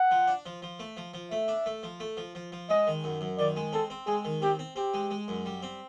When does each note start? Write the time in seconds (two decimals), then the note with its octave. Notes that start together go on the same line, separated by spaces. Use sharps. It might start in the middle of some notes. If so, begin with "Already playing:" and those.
Already playing: F#5
0.11 F3
0.28 D4
0.46 F3
0.62 F3
0.79 A3
0.97 F3
1.14 F3
1.31 A3 E5
1.48 D4
1.66 A3
1.83 F3
2.00 A3
2.17 F3
2.35 F3
2.52 F3
2.70 G#3 D#5
2.87 D#3
3.04 F#2
3.21 F#2
3.38 D#3 D5
3.56 G#3
3.73 C4 A4
3.90 C4
4.07 G#3 G#4
4.25 D#3
4.42 C4 G4
4.59 C4
4.76 C4 G4
4.94 G#3
5.11 G#3
5.28 F#2
5.46 G3
5.63 C4